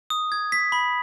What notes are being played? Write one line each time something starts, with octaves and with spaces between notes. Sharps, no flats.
D#6
G#6
B6
B5